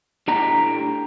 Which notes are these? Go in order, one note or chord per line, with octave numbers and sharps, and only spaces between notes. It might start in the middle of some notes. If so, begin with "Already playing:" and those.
A2 D4 G4 A#5